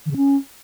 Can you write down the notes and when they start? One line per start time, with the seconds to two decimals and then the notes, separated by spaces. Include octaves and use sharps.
0.06 D#3
0.11 C#3
0.16 C#4